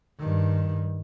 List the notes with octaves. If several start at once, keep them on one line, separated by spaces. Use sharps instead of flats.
G2 D#3